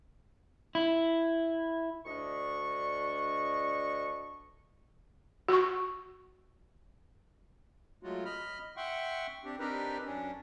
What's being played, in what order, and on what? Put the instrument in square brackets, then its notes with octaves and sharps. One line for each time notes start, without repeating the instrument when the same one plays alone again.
[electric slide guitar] E4
[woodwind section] D2 D4 D#5 C#6
[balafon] F#4 C#6
[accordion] F#3 G#3 A3 F4 F#4
D#5 B5 F6
E5 F#5 G5 C6 C#6
C4 D4 G4
C4 D4 D#4 G4 A#4 B4
F#2 C#4 D4